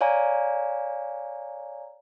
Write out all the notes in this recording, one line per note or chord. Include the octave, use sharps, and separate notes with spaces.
C#5 D5 F5 G#5 A#5